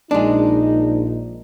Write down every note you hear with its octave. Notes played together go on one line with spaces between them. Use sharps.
A#1 G#3 D4 D#4